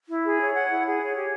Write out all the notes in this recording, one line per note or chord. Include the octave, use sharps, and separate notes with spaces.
E4
G#4
C#5
F#5
E4
G#4
C#5
G4